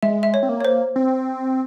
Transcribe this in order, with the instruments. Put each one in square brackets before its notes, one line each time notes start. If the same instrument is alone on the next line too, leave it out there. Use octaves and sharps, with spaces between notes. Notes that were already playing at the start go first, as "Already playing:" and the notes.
[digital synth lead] G#3 [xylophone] E5
[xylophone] E5
C#5
[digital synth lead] C4
A#3
[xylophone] C#5
C5
[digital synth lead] C4